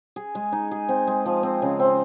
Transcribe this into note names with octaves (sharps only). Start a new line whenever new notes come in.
G#4
G#3
D#4
G#4
C4
G#3
F3
C4
C#3
C4